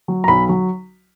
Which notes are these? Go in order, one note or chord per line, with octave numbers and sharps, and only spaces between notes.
F#3
A#5
B1 B5
F#3